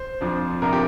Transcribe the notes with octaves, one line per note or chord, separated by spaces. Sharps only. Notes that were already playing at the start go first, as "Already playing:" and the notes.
Already playing: C5
F2 F3 D4
C2 C3 F3 D4 A#4
G4